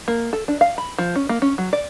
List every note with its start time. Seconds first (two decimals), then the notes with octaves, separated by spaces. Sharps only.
0.08 A#3
0.33 A4
0.48 D4
0.61 F5
0.78 B5
0.98 F3
1.16 C#4
1.29 A#3
1.42 C#4
1.58 F#3
1.73 D5